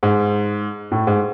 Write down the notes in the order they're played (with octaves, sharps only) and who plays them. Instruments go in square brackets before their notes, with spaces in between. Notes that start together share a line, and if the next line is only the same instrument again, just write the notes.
[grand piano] G#2
A2
G#2